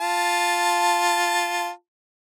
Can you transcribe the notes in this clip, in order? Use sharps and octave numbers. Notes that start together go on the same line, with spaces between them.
F4 A5